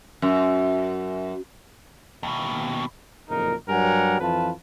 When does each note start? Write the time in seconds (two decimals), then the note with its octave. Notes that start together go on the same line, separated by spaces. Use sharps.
0.22 F#2
2.23 D#2 B2
3.28 F#1 F2 A#2 D#4 A#4
3.69 G2 F#3 G3 A#4 F#5 G#5
4.20 F2 E3 F4 B4 A5